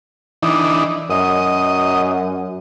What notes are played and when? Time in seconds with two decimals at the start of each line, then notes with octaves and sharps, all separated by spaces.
0.43 E3 D4 D#4
1.10 F#2 D#5